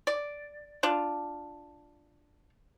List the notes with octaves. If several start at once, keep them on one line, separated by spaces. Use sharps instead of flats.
D5
D4 F4